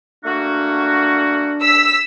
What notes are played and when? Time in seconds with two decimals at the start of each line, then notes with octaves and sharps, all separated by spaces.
0.25 A3 A#3 D4 F#4
1.61 E6 B6